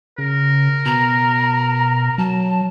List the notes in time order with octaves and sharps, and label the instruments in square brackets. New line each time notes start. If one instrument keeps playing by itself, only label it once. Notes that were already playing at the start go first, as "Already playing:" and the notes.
[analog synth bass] C#3 [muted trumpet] A#4
[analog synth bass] B2 [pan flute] A#5
[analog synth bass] F#3 [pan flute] A5